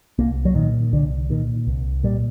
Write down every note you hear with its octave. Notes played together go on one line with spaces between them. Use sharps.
C2 A#3
F#3
A#2 D#3
C2 D3
A#2 D#3
C2
A#2 G3